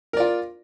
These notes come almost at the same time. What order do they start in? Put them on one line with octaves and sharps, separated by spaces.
A#4 D5 F4